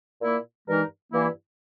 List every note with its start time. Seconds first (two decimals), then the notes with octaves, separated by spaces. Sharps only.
0.20 A#2 A#3 E4
0.66 G2 E3 G#3 D#4 A#4
1.12 G2 E3 A#3 E4